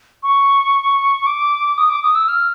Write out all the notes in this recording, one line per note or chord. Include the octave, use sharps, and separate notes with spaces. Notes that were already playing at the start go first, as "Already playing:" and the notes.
C#6
D6
D#6
D6
D#6
E6
F6